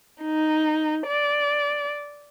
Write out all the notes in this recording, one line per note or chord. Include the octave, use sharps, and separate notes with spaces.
D#4
D5